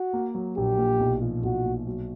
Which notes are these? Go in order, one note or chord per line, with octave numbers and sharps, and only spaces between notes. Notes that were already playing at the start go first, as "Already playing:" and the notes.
Already playing: F#4
A#3
F#3
A#1 G4
A#2
B1
F3
B1 F#4
A#2
F#3